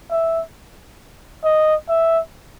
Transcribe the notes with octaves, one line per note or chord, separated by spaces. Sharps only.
E5
D#5
E5